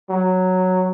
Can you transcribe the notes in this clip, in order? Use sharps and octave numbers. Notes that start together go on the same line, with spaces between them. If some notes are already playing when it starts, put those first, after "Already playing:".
F#3